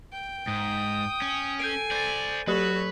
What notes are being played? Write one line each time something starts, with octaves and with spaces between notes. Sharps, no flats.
G5
G#2 D#6
C#4
A4 G#5 G6 C7 D7
C5 D5 G6 A6
F#3 F#4 G4 A4 B4 C#5